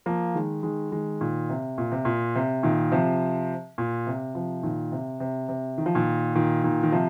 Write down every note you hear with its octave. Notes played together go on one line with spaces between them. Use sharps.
F3 A#3
D#3 G#3
D#3 G#3
D#3 G#3
A#2 D#3
C3
A#2
C3
A#2
C3
A#2 D#3
C3 F3
A#2
C3
C3 F3
A#2 D#3
C3
C3
C3
D#3
F3
A#2 D#3
A#2 D#3
A#2 D#3
D#3
C3 F3